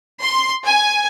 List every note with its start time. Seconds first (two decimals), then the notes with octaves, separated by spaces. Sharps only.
0.21 C6
0.65 G#5